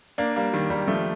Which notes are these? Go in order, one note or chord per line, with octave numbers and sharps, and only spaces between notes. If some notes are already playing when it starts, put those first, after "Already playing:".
A#3 D4
G3 A#3
D#3 G3
D#3 G3
F3 A3